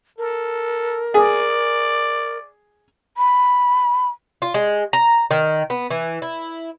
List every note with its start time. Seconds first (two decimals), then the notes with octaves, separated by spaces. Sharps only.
0.18 A4 A#4
1.14 G#4 D5
3.17 B5
4.42 F4
4.54 G#3
4.93 A#5
5.31 D#3
5.70 B3
5.90 E3
6.22 E4